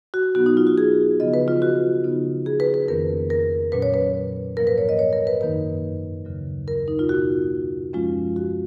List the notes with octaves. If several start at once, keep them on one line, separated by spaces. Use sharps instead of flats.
F#4
B2 F#3 B3 D#4 F#4
D#4
F4
F#4
G#4
C#3 F3 B3 D#5
B4
F4
F#4
C#3 F3 B3 D#4
G#4
B4
B4
F2 D#3 A#3 C#4 A#4
A#4
A#2 F#3 C#4 B4
C#5
B4
G#2 F3 A#3 A#4
B4
C#5
D#5
C#5
A#4
B4
F#2 D#3 A#3 D#4 B4
D#2 C#3 F#3
A#4
D#4
F4
B2 A#3 D#4 F#4
F#2 F3 G#3 C#4 F4
F#4